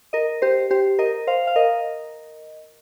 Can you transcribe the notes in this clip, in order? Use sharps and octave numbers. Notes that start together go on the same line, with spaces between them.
A#4 D#5
G4 C5
G4 C5
A#4 D#5
C5 F5
F5
A#4 D#5